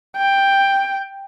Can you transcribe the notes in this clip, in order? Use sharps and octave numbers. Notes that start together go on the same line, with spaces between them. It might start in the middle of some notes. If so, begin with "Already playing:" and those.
G5